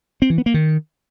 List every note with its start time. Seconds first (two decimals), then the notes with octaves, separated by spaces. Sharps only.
0.22 C4
0.30 E3
0.38 B3
0.46 A#3
0.54 D#3